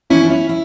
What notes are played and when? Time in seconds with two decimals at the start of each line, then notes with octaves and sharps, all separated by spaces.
0.10 E3 C#4 E4
0.24 D4
0.30 C#4 E4
0.49 E4